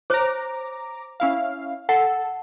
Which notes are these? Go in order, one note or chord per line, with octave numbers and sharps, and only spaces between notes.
C5 C#5 A#5 D6
C#4 E4 F5
A4 F#5